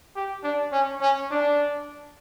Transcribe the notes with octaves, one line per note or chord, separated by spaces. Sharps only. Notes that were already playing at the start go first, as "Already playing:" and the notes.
G4
D4
C#4
C#4
D4